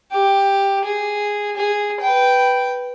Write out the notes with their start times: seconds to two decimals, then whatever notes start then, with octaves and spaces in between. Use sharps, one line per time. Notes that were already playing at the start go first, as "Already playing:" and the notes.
0.11 G4
0.85 G#4
1.56 G#4
2.00 B4 G5